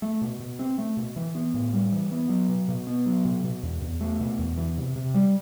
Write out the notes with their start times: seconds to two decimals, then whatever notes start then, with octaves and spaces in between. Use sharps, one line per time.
0.02 A3
0.22 B2
0.40 B2
0.59 C4
0.78 A3
0.97 B2
1.16 E3
1.35 B3
1.54 A2
1.73 G3
1.92 E3
2.11 B3
2.29 F#3
2.49 B2
2.69 B2
2.87 B3
3.06 F#3
3.25 B2
3.44 B2
3.63 E2
3.82 E2
4.01 A3
4.20 B2
4.39 E2
4.57 E3
4.77 C3
4.96 C3
5.14 G3